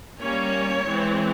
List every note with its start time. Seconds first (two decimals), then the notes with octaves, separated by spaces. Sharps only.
0.21 G3 A#3 C#4 C#5
0.87 E3 G#3 C4